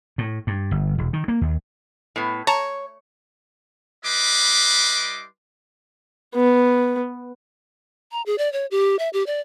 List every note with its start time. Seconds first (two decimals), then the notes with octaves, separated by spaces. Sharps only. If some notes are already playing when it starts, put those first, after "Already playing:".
0.18 A2
0.47 G2
0.71 G1
0.98 E1
1.13 D#3
1.28 A#3
1.41 D#2
2.16 A2 B3
2.47 C#5 A5 A#5
4.05 G3 E4 B4 D#5 C6 D6
6.35 B3
8.12 A#5
8.26 G#4
8.38 D5
8.53 C#5
8.71 G4
8.99 E5
9.13 G4
9.26 D5